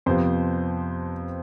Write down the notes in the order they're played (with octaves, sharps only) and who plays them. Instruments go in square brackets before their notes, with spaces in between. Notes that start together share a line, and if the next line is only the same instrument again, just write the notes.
[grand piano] F2 C3 F3 B3 C5